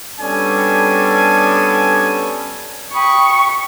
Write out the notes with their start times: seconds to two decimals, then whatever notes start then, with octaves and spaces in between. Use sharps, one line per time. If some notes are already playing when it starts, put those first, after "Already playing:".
0.20 G3 B3 C#4 D4 A4 G#5
2.93 G5 B5 C#6 D#6